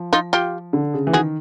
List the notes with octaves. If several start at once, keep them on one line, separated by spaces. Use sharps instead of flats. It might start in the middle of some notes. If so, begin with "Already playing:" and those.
Already playing: F3
D#4 F4
F4 G4
D3
C#3
E3
D#3 F#4 G#4